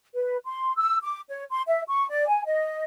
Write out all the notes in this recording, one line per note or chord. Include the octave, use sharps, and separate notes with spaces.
B4
C6
E6
D6
C#5
C6
E5
C#6
D5
G#5
D#5